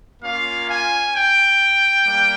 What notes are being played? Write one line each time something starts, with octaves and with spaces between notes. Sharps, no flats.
A#3 C#4 F4 F5
G#5
G5
G3 A#3